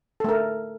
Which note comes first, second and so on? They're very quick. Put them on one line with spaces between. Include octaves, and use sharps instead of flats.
A4 A3 A#4